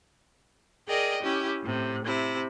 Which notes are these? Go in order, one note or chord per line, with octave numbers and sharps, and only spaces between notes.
G#4 A#4 D5 D#5 G5
C#4 E4 G4
A2 C3
C3 E4